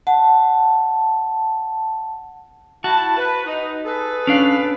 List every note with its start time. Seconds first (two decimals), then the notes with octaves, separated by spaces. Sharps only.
0.07 F#5 A5
2.84 E4 F#4 A5
3.16 B4
3.45 D#4
3.86 G#4 A4 B4
4.27 C#4 D4 F5